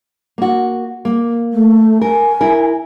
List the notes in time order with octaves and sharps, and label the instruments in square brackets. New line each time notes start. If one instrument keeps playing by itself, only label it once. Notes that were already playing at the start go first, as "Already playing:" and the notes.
[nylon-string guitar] A#3 F#4
A#3
[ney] A3
[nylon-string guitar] A#4 [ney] G#5
[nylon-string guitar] E4 A#4